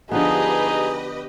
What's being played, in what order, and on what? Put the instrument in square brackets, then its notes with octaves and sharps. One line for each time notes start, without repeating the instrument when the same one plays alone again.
[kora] D3 F3 B3 [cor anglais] D#4 [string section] G4 B4 D#5 [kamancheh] G#4